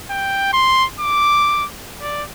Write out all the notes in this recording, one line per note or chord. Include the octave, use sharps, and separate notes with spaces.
G5
C6
D6
D5